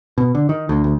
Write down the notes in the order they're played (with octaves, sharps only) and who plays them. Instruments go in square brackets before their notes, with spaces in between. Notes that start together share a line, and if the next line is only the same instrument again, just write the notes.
[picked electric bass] B2
D3
D#3
D2
D2